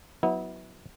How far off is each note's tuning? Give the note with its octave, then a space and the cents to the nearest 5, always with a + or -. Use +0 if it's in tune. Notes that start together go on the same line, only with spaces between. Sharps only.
F#3 +0 B3 +0 E4 -35